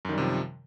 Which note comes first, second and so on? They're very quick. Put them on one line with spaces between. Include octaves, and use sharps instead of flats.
F#2 D#3 G3 C3 F3